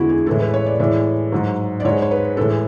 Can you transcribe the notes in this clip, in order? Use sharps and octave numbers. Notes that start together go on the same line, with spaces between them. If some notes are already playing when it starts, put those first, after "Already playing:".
Already playing: E2 D3 G#3 E4 F#4
G#4
A2 E3 G#3 A4
B4
C#5
D5
A2 E3 G#3 D5
G#2 F#3
D5
G#2 G#3 C#5
C#5
B4
A2 E3 G#3 A4
G#4